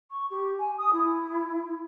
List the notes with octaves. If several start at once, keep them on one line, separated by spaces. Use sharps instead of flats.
C#6
G4
G#5
D#6
E4